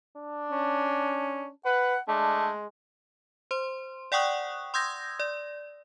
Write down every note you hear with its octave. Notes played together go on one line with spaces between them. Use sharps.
D4
C#4
B4 F#5
G#3 A3 D4
C5 C6
D5 F#5 G5 C#6 D#6 F#6
C6 D#6 E6 G6 G#6 A#6
D5